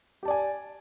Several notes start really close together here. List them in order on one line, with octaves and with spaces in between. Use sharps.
G4 A5 D5 G#5